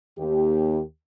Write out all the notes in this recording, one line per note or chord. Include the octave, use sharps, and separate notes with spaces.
D#2 G4